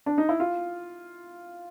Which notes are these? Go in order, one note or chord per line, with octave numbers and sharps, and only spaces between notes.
D4
D#4
E4
F4